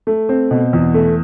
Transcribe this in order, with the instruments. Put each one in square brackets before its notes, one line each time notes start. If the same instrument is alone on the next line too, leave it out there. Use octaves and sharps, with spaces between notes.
[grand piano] A3
C4
B2
E2
A3